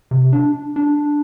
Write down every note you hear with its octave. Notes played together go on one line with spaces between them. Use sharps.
C3
D4
D4